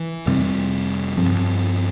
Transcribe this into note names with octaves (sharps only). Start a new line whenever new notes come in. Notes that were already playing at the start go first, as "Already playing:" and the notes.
Already playing: E3
F2 C3 G3 C4
G2 F3 C4